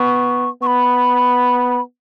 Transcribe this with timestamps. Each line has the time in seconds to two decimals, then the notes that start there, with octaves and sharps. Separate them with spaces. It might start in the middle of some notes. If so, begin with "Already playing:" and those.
Already playing: B3 C#6
0.62 B3 B5 C#6